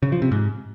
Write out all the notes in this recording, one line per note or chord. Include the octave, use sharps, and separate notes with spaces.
C#3
F3
C3
G#2